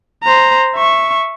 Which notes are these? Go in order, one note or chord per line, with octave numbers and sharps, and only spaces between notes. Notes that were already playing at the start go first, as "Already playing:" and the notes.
C5 A#5
E5 C#6